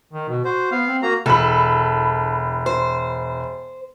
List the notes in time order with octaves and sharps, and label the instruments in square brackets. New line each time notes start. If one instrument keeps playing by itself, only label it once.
[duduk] D#3
B2
[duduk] F#4 [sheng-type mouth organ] C5
[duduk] B3 [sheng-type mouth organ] F5
[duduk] C4
[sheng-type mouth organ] A#3 A#5 [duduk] F#4
[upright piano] E1 B5 [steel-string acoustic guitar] A4
[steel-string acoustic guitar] C5